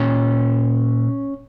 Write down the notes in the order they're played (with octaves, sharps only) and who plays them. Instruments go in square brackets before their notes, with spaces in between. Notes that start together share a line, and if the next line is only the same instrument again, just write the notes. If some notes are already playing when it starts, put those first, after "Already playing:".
Already playing: [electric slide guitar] A#2 C#4